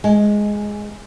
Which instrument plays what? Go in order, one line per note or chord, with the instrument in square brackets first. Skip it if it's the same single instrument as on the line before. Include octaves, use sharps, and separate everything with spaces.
[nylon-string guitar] G#3